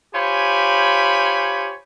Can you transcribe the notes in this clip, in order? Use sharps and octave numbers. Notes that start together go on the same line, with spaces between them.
F4 G4 C5 C#5 G#5 B5